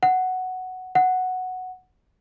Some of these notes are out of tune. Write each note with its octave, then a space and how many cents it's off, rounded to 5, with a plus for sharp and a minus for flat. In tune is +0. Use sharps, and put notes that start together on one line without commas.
F#5 +5
F#5 +0